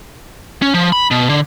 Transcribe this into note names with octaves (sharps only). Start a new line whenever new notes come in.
C#4
F3
B5
B2
D3